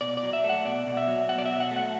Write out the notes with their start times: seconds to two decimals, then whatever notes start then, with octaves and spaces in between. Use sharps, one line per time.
0.01 B2 D5
0.17 D5
0.23 F#3
0.33 E5
0.44 A3
0.49 F#5
0.65 B2 D5
0.87 B2
0.97 E5
1.08 F#3
1.29 B2 F#5
1.38 D5
1.45 F#3 E5
1.60 F#5
1.71 A3
1.76 F#5